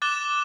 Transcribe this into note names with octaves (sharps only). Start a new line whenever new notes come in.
D6 F#6 A6 E7 G7